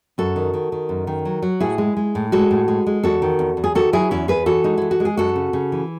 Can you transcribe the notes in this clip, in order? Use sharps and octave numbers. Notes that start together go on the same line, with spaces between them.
F#2 F#4 A4
D#3
D#3
D#3
F#2
D#3
F#3
F#3
A2 E4 G#4
G#3
G#3
A2
G#3 F#4 A4
A2
G#3
G#3
E2 F#4 A4
D#3
E2
E2
G#4
D#3 F#4 A4
F#3 E4 G#4
E2 C#4 E4
E2 G#4 B4
E3 F#4 A4
G#3 D#4
E3 E4
F#4
G#3
G#4
F#2 F#4 A4
C#3
C#3
E3